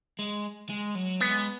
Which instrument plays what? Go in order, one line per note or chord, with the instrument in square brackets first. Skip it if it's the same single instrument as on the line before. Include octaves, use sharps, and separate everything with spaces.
[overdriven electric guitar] G#3
G#3
F#3
[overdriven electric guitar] G#3 [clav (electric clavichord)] B3